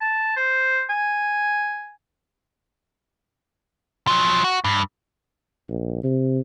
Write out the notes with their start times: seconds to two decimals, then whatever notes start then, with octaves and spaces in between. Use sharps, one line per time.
0.01 A5
0.37 C5
0.90 G#5
4.07 F3 F#3
4.44 F#4
4.64 G2
5.69 A#1
6.03 C3